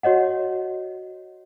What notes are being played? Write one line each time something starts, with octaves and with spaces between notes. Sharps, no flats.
F#4 C#5 D#5 F#5